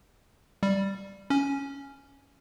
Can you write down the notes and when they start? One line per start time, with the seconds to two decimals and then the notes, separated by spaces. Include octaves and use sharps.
0.63 G3
1.30 C#4